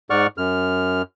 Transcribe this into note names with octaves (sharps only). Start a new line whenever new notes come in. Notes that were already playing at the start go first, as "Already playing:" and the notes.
G#2 D5 F#5 C#6 F6
F#2 F6